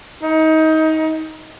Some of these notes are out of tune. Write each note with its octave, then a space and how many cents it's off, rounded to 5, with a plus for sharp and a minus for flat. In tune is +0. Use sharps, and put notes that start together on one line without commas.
D#4 +25